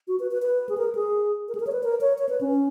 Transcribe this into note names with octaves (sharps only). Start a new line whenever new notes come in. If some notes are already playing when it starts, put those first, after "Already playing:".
F#4
B4
B4
B4
G#4
A#4
G#4
A#4
G#4
A#4
C#5
B4
A#4
C#5
C#5
B4
C#4